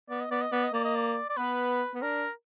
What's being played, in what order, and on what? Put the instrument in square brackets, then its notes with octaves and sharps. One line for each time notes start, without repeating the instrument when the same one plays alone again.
[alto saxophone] B3 [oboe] D5
[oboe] D#5
[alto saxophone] B3 [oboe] D5
[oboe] D#5
[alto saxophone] B3 [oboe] D5
[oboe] D#5
[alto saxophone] A#3 [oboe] D5
[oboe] D#5
D5
D5
[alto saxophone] B3 [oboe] B4
[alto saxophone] B3
[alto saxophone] D4 [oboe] A#4